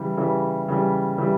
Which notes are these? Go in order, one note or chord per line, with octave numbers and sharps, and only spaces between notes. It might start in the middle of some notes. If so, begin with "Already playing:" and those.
Already playing: C#3 E3 G3
C#3 E3 G3
C#3 E3 G3
C#3 E3 G3